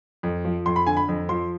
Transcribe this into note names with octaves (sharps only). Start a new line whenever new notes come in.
F2
F3
F2 C6
B5
D3 G#5
B5
F2
F3 C6